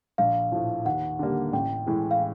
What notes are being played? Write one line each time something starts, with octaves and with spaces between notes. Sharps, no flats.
A#1 F5
A2 F3
D#2 F#5
D3 G3 A#3
A1 G5
A2 E3 G#3
F5